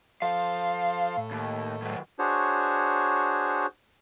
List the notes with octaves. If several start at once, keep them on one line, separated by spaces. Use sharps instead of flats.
F3 A4 C5 F5
A2
D#2
D#3 F#3
D4 F#4 G#4 C5 C#5